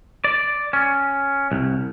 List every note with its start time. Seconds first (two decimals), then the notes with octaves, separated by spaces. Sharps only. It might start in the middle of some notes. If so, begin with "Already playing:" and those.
0.24 D5
0.73 C#4
1.52 C2